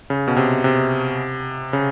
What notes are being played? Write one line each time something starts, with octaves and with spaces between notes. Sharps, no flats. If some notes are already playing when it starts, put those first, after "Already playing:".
C#3
B2
C3
C3
C#3